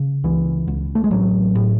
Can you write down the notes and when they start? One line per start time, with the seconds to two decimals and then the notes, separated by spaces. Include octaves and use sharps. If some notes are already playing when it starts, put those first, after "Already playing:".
Already playing: C#3
0.24 C#2 E3
0.67 C#2
0.95 A3
1.04 G#3
1.11 A1 F#3
1.55 A2